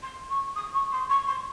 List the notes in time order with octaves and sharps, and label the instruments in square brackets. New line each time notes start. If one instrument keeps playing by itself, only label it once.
[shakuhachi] C6
C#6
D#6
C#6
C6
C#6
C6